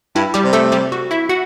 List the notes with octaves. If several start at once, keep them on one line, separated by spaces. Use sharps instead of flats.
G2 E4
G3 G4
C3
A3 A4
G3 G4
F#4
E4 E5
F#4 F#5